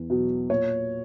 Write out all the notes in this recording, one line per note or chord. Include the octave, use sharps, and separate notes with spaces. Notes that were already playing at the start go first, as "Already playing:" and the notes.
Already playing: E2
B2 F#3
A#2 C#5